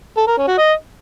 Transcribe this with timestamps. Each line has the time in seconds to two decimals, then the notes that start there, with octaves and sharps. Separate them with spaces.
0.17 A4
0.27 A#4
0.38 C#4
0.48 F#4
0.58 D#5